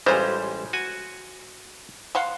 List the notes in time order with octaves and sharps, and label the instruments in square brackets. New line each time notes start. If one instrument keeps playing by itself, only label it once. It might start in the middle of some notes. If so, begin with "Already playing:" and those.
[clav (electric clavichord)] A1 G3 G#3 [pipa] C#4 F4 C5
[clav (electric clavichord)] F#4 G#5
[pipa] F5 F#5 C6